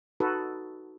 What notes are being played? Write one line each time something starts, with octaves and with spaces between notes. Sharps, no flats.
D#4 F#4 A4 B4